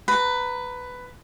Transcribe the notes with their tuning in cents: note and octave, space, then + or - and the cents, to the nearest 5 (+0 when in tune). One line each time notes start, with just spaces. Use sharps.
B4 +10 A#5 -10